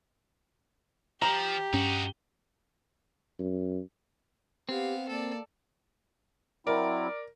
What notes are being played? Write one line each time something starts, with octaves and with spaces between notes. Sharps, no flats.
F3 G4 A#5
G2 C#4 D#4 F#4
F#2
B3 C4 G4 F5
A#3 A4 D5
F#3 C4 E4 A#4 D5